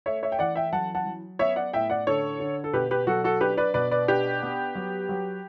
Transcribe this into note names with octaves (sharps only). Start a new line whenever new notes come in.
A3 C#5 E5
C#5 E5
G5
E3 D5 F#5
E5 G5
F#3 F#5 A5
F#5 A5
F#3
B3 C#5 E5
D5 F#5
A2 E5 G5
D5 F#5
D3 A4 C#5
D3
A4
B2 G4 B4
G4 B4
F#3 F#4 A4
F#4 A4
D4 G4 B4
B4 D5
B2 B4 D5
B4 D5
D4 G4 B4
B3
F#3
F#3